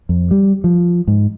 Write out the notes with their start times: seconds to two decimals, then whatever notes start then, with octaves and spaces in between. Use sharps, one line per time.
0.09 F2
0.31 G3
0.64 F3
1.08 G#2